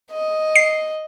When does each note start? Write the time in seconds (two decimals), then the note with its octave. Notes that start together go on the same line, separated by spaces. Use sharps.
0.12 D#5
0.56 C7